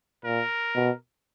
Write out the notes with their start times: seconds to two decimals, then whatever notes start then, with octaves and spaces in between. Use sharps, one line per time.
0.25 A#2 A#4
0.75 B2